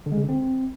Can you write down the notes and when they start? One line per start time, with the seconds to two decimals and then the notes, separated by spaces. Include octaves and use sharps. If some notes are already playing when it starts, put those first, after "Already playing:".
0.06 D3
0.12 G#3
0.17 C#3
0.23 D3
0.29 C4